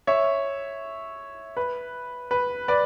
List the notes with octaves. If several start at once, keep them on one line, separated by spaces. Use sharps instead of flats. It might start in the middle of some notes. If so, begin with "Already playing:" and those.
C#5 E5
B4
B4
B4 D5